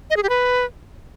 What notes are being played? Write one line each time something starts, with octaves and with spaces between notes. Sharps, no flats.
D#5
G#4
G4
B4